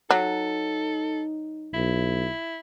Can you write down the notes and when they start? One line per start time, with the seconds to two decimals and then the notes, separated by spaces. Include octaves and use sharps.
0.10 F#3 D#4 A4
1.74 B1 E4